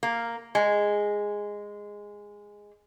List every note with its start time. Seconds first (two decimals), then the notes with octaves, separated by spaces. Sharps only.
0.03 A#3
0.55 G#3